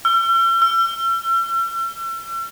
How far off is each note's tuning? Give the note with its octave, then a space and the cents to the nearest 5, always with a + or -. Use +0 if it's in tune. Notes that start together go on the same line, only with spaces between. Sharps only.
E6 +45
E6 +40